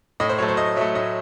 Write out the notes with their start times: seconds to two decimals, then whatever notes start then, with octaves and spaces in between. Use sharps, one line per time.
0.20 A2 D#5
0.29 C5
0.38 F#3 A3 C#5
0.48 C5
0.57 A2 D#5
0.76 F#3 E5
0.81 A3
0.95 A2 D#5